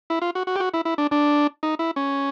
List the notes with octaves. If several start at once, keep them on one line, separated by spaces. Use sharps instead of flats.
E4
F4
F#4
F#4
G4
F#4
E4
E4
D4
D4
D#4
E4
C#4